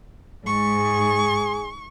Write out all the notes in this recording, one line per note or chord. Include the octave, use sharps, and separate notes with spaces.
G#2 G#4 C#6